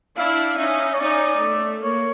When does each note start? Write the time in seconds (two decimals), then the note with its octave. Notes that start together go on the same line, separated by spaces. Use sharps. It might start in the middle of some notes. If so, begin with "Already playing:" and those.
0.17 D4 E4 F5
0.59 C#4 D#4 E5
0.94 C#5
1.00 C#4 D#4 D5
1.42 A3
1.83 A#3 C#5